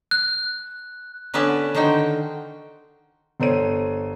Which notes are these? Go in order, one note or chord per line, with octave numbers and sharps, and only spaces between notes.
F#6
D3 B3 C#4 B4 D5 A5
D3 D#3 D#4 F#4 C5 G5
G1 A4 C5 C#5 D#7